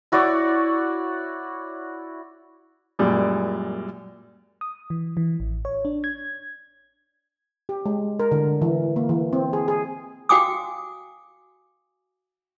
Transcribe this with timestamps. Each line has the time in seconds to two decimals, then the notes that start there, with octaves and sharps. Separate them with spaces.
0.12 E4 F#4 C#5 D5
2.99 F#2 A#2 G3 G#3
4.61 D#6
4.90 E3
5.17 E3
5.40 A1
5.65 C#5
5.85 D4
6.04 G#6
7.69 G4
7.86 G#3
8.20 A#4
8.32 D3
8.62 E3
8.96 A#3
9.09 E3
9.33 C4
9.53 G#4
9.68 G#4
10.29 F#4 F5 G5 G#5 D6 D#6